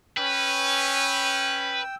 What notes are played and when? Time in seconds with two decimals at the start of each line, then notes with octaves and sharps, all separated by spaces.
0.17 C#4 B4 G5 E6